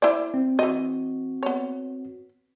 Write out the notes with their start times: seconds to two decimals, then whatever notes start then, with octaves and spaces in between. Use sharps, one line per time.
0.02 E4 C5 D5
0.34 C4
0.59 E3 C4 F#4 D#5
1.43 B3 C#5